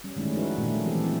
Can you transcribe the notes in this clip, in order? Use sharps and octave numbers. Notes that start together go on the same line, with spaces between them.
G3 C#4
D#3 G#3 A3 C#4 E4
F3 D#4 F#4 B4
A#2 D#3 A3 A#3 D4
E3 F#3 G#3 C4 G4 A4
C4 E4